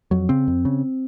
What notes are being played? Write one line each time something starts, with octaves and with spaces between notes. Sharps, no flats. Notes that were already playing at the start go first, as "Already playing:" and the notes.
F2 F#3
C#3 C4
F2
C#3